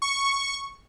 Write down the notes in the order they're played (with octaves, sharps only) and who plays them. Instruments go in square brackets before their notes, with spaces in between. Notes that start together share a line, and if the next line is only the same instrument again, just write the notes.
[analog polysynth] C#6